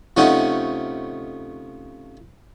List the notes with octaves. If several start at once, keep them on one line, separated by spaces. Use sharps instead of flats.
C3 F3 A3 C#4 D#4 F#5